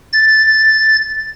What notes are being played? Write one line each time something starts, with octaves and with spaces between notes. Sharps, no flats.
A6